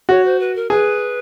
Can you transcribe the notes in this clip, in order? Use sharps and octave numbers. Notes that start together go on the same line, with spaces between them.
F#4 C#5
C5
B4
A#4
G#4 B4